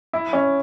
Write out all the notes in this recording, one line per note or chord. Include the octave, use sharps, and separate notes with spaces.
E4
C#4